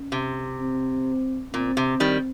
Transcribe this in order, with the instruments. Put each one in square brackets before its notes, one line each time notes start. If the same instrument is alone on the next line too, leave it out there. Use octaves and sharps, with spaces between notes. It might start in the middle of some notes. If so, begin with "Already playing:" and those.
Already playing: [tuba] C#4
[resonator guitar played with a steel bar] C3
[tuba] C4
[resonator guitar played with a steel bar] A#2 [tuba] C4
[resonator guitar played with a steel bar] C3
D#3 G3